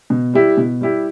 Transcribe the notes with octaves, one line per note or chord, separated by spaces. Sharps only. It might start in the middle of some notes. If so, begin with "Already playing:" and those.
B2
G3 E4 G4
B2
G3 E4 G4